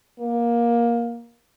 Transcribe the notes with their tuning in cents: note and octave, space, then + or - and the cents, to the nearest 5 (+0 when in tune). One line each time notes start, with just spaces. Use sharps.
A#3 +15